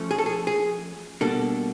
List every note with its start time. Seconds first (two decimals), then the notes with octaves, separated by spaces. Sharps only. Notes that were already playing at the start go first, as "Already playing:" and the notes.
Already playing: F3 A3 C#4
0.11 G#4
0.18 A4
0.26 G#4
0.47 G#4
1.21 B2 G3 A#3 D4 A4